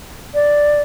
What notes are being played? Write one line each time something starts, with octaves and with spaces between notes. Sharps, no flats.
D5